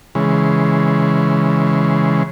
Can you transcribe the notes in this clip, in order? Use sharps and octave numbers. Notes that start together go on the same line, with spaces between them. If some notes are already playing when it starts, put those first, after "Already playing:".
C#3 E3 G#3